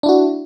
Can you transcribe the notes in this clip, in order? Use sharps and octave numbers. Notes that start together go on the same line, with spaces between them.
D4 E4 F#4